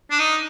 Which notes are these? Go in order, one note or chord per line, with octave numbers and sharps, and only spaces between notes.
D4
D#4